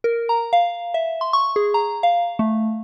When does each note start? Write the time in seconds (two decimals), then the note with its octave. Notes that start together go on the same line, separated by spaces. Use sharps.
0.04 A#4
0.29 A#5
0.53 F5
0.94 E5
1.21 C6
1.33 C#6
1.56 G#4
1.74 A#5
2.03 F5
2.39 A3